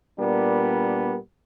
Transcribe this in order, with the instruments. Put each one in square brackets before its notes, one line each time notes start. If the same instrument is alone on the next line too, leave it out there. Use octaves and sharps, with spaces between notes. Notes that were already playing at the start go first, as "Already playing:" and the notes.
[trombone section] A#2 G3 B3 D4 A#4